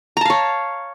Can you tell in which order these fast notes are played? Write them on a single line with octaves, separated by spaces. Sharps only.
A#5 A5 F5 C#5